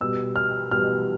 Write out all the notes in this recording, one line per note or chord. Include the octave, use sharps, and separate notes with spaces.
B2 G3 B3 E6
F6
B2 G3 B3 F6